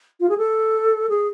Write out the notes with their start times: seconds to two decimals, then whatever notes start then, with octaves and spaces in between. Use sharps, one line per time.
0.20 F4
0.29 G#4
0.38 A4
1.09 G#4